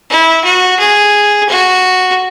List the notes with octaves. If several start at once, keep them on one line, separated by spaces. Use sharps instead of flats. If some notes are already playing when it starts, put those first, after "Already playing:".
E4
F#4
G#4
F#4